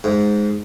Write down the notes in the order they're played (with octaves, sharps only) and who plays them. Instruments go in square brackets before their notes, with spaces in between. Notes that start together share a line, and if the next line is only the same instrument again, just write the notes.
[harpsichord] G#2